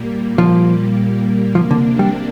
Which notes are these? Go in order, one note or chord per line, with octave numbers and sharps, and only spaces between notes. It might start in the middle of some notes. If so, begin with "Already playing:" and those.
Already playing: A#2 G3 A#3
F3
C3 F3 A#3 D4
D3
G3